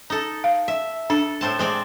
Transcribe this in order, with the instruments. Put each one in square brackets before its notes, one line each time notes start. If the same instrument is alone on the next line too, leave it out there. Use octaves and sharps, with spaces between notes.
[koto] D#4 A4
[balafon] F5
[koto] E5
[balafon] D4 [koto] A4
[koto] A2 C4 A5
G#3 C4 D5